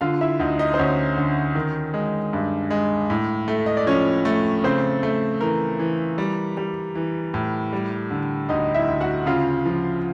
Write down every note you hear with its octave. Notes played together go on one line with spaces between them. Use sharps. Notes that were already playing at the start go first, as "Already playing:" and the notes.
D3 F4 F5
E4 E5
D2 D#4 D#5
D#4 D#5
C5
D2 C#4 C#5
D3
D#3
G#3
G2
G#3
A2
A3
D#5
D5
F3 C#4 C#5
A3
C#3 C4 C5
A3
E3 A#4
E3
G3
G3
E3
A2
G3
D3
D2 D#4 D#5
E4 E5
D2
F#4 F#5
C#3 F4 F5
F3